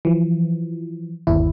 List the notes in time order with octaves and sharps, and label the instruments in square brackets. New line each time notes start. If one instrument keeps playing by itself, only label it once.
[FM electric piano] E3 F3
G1 D#2 E4